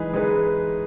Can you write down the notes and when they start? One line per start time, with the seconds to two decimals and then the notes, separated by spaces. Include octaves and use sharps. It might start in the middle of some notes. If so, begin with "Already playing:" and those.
Already playing: E3 G#3 D#4 G#4 B4
0.13 E3 G#3 D#4 G#4 B4